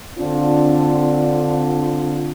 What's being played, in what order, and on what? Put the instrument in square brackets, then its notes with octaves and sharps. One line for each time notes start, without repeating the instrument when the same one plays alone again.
[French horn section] D3 C4 D4 F4